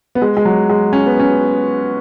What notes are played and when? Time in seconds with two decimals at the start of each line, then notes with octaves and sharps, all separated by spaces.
0.15 B3
0.22 G#3
0.37 G#3
0.45 F#3
0.69 G#3
0.93 C#4
1.06 B3
1.19 C#4